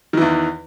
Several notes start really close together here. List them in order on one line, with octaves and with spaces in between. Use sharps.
D#3 E3 E2